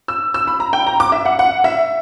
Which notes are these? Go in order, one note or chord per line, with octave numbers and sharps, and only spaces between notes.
E6
E6
B5
A#5
G5
A#5
D6
E5
F#5
F#5
E5